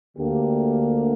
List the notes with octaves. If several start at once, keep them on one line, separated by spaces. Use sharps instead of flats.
D2 D3 A#3 G4